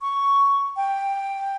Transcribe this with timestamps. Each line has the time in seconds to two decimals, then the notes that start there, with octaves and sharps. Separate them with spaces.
0.01 C#6
0.76 G5